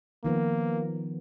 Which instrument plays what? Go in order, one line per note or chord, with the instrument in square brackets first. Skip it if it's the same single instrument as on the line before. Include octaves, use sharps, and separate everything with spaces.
[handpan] D#3 F3 B3 [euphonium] A#3